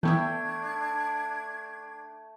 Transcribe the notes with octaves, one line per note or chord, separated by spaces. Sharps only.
E3 A3 B3 D4 E4 G5 G#6